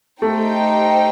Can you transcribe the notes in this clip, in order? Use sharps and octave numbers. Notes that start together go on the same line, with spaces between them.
A3 D#4 G4 C5 G5